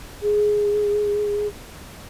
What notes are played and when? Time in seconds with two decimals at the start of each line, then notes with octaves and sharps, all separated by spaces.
0.23 G#4